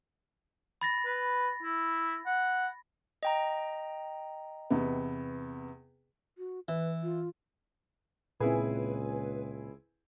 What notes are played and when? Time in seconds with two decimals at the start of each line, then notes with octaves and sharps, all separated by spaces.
0.81 B5 A6 A#6
1.06 B4
1.63 E4
2.26 F#5
3.23 D#5 G5 A#5
4.70 E2 C3 B3
6.38 F#4
6.68 E3 B4
7.03 F4
8.40 C#2 A#2 C4 E4 G#4 B4 G#5